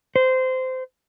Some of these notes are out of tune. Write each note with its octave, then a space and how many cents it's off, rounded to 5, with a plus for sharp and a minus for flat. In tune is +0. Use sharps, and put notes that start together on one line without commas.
C5 -20